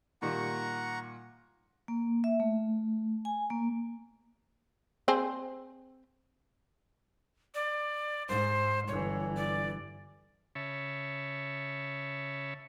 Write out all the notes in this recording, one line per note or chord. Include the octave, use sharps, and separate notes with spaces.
A#2 D#3 G3 F#5 A#5 C#6
A#3
E5
A3
G#5
A#3
C4 G#4 C5
D5
G#2 C5
G1 E3 C#5
D5
C#3 C#5 E5 A5 B5